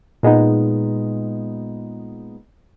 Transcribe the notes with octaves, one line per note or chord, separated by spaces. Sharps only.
A#2 G#3 B3 D#4